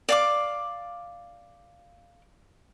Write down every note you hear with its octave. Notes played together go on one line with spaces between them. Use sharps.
D5 F5 D6